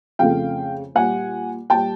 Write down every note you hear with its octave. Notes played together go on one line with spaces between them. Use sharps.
F2 C#3 F3 A3 F5 G5
A#2 G3 F#5 G#5
A#2 G3 G5 A5